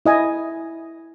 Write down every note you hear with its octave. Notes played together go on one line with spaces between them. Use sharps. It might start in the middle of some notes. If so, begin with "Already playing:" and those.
E4 D#5 G#5